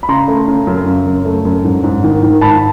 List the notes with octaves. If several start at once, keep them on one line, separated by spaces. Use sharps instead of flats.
B5
C#3 A#5 C6
A3
C#3
F#2
C#3
F#2
A3
F#2
G#2
G#2
D#3
D#3
G#2 A5 B5